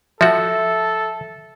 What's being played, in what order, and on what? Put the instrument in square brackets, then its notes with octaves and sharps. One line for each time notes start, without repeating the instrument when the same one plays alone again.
[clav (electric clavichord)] F3 F#4 [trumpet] A4 [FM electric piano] E5